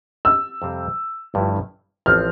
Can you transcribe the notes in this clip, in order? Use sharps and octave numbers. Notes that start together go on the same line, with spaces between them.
E6
F2 C3 G3 C4
G1 G2 F3 A3 E4
A1 A2 F3 C4 F6